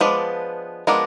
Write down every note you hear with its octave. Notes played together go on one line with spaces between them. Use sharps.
F3 G#3 B3 D4 B4
F3 G#3 B3 D4 A#4